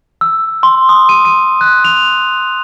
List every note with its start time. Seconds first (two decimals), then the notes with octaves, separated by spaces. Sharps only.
0.21 E6
0.63 C6
0.89 D#6
1.09 D#7
1.25 D#7
1.61 F#6
1.85 F7